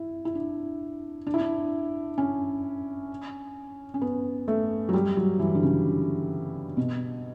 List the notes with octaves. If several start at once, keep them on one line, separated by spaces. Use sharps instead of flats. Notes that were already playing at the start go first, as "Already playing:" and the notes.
Already playing: E4
E4
D4
D4
E4
D4
C#4
C#4
B3
A3
F#3
G3
F#3
E3
D3
C#3
B2